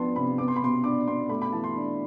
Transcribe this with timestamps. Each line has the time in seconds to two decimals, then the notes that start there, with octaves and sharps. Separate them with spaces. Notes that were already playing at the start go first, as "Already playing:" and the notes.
Already playing: F3 B3 D4 G5 A5 C6
0.16 C3 B5
0.38 B3 D6
0.48 C6
0.56 B5
0.62 B2 C6
0.84 D4 D6
1.07 B2 C6
1.29 A3 B5
1.42 B5
1.52 E3 A5
1.64 C6
1.76 D4